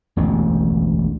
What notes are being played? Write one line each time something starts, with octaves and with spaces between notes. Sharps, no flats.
E1 A1 D2 C3